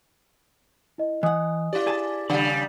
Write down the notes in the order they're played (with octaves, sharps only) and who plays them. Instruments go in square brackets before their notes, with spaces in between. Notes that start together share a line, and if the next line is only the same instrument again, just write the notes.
[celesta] E4 D#5
[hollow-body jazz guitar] E3 F#5 [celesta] D#5 G#5 D#6
[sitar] E4 D5 [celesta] G4
[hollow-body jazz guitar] G#4 G#5 A5
[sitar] C#3 G3 [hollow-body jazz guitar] D4 D5 F#5